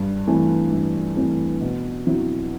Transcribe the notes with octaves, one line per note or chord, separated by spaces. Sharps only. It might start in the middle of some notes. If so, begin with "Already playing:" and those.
Already playing: G2
E3 A3 C4
G2
E3 A3 C4
B2
F#3 C4 E4